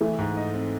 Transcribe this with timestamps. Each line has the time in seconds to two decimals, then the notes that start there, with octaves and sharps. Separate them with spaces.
0.01 E3 A3
0.18 G#2
0.36 D#4
0.53 C4